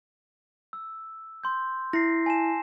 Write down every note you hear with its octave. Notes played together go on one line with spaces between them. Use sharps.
E6
C6 G6
E4 A#6 C7
G#5 A5 E7